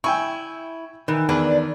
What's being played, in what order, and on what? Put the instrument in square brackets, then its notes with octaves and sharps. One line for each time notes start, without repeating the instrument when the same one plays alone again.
[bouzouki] E4 [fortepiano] G5 G#5 C#6
[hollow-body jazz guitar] D#3 [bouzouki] E3
[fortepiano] E2 [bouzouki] D4 B4